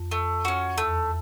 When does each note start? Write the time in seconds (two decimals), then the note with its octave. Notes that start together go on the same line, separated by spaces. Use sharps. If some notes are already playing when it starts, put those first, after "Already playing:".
Already playing: F2
0.11 A3
0.45 C#4 F#4
0.77 E2 A3